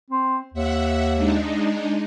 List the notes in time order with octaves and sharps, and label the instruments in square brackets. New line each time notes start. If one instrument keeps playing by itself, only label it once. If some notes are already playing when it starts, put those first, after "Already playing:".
[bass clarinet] C4
[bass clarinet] D#2 [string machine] E5 F#5
[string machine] G#3 D4 D#4